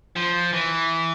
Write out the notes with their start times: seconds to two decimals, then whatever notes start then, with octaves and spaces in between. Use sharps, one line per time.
0.16 F3
0.53 E3